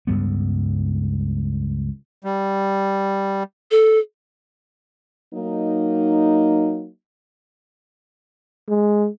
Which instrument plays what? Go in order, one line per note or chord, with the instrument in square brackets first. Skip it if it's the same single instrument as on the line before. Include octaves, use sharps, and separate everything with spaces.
[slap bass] C#2 G2 G3 B3
[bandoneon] G3
[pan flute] A4
[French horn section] F#3 A#3 D#4
[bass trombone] G#3